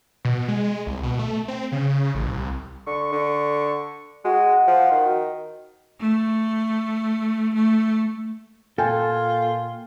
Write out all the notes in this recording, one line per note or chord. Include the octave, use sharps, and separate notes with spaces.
B2
G#3
C2
B2
A3
C4
C#3
A1
C2
D3 C#6
D3
G#3 F#4
F3
D#3
A3
A3
A#2 F4 A4 G5 G#5